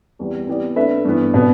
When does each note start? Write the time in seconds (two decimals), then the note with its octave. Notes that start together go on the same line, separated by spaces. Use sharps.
0.19 E2 E3 G3
0.47 E3 B3 G4 D5
0.76 A3 D4 B4 E5
1.05 G2 E3 B3
1.34 B2 B3 D4